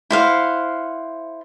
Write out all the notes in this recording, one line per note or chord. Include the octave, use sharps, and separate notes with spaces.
E4 C5 F5 F#5